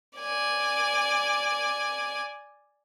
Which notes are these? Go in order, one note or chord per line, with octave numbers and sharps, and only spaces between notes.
D5 G#5